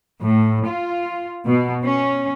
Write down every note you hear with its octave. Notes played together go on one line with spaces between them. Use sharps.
A2
F4
B2
C#4